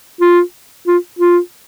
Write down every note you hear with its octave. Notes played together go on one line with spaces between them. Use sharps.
F4
F4
F4